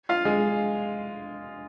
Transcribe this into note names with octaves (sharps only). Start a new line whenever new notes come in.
F4 F5
G#3 G#4